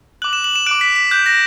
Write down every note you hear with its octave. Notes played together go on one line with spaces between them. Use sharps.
D6 F#6 F#7
E7
F#7
E7
D6 F#6 D7
B6
B6
D6 F#6 G6
A#6